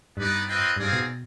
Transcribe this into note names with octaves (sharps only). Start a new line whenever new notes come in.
G2 B3 D#4 B4 D5
C4 F4 B4 D#5 G5
G2 C4 D#4 G#4 D5 F5
B2